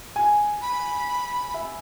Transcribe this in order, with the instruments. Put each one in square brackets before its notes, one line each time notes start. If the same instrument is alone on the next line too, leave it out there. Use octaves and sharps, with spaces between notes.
[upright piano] G#5
[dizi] B5
[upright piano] E5